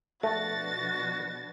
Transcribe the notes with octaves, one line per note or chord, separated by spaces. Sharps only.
B2 F3 A3 D4 F#4 A6